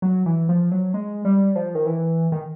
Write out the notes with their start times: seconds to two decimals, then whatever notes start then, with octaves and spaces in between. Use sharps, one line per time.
0.02 F#3
0.26 E3
0.49 F3
0.71 F#3
0.94 G#3
1.25 G3
1.55 F3
1.75 D#3
1.86 E3
2.32 D#3